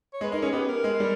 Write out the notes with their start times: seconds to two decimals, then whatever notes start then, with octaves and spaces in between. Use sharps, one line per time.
0.13 C#5
0.21 G#3 B4
0.32 D#4 A#4
0.42 C#4 G#4
0.52 B3 G4
0.68 A#4
0.84 G#3
1.00 G3